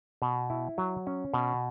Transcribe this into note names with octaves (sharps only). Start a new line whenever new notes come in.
B2
E4
F#3
C#4
B2